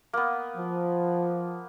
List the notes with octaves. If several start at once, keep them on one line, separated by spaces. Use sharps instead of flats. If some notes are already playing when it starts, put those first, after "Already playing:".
A#3 B3
F3